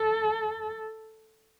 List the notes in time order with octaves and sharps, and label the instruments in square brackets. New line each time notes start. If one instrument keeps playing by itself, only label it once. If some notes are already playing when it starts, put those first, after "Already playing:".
Already playing: [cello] A4